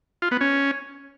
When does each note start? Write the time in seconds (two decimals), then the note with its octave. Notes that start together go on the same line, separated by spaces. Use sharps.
0.22 F4
0.31 B3
0.41 C#4